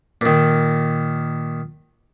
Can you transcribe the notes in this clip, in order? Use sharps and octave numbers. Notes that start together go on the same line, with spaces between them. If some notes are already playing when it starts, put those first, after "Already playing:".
A#2 D#3